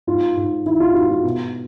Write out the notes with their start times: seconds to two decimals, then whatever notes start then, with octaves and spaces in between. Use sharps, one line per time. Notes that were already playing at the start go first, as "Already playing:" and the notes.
0.07 G#2 F4
0.37 G#2
0.66 D#3 E4
0.80 F4
0.94 G#2 F#4
1.10 F4
1.24 B2